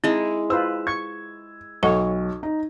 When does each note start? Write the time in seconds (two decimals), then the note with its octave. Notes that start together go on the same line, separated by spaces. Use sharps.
0.04 G#3 C4 D#4 E4
0.50 F4 B4 C5 E6
0.87 C#6 G#6
1.83 B1 A4 C#5 D#5 F#5
2.43 D#4